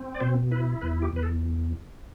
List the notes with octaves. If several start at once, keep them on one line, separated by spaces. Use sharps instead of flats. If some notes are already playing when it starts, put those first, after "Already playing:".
Already playing: C4
D5
B2 C5
E4 B4
E2 B4
G4
E2 B4
A4